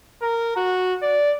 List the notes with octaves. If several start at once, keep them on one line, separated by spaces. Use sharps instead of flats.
A#4
F#4
D5